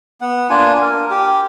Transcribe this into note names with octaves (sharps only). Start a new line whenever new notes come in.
B3 F#5
A#3 D4 F4 G#5
A#4
G4